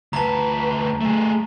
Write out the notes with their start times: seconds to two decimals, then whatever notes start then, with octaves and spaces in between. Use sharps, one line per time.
0.13 D2 B4 A5 A#5
1.01 A3 G#4